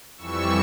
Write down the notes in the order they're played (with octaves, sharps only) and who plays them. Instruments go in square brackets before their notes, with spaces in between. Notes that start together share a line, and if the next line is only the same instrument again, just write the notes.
[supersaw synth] F2 E3 G3 C#6 E6